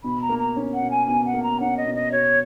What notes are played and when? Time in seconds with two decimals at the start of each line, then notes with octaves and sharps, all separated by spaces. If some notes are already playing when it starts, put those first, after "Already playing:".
0.04 B2 B5
0.22 A#5
0.29 A#3
0.39 A#5
0.56 C#4
0.74 F#5
0.81 B2
0.91 G#5
1.07 B2 G#5
1.25 F#5
1.34 A#3
1.43 A#5
1.60 C#4 F#5
1.77 D#5
1.86 B2
1.95 D#5
2.12 F#4 C#5